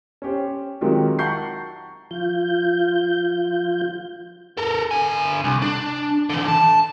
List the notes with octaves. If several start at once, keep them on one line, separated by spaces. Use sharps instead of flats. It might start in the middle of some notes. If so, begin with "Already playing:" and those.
C#4 G4 C5
D#3 F#3 G#3 C4 F4 G4
F#5 A5 A#5 C#6 G6 C7
F3 F4 G6
A4 A#4
D3 G#5
C2
D4
D3 E3
A5